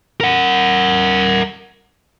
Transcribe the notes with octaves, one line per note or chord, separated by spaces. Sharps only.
A#4 F#5